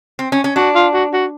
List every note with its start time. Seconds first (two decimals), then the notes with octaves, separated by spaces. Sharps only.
0.19 C4
0.32 C#4
0.44 C#4
0.56 D4 F#4
0.75 F4
0.93 F#4
1.13 F#4